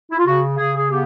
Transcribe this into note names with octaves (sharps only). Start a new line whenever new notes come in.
E4
F4
C#3 F#4
C#3 G#4
G#4
B3 G4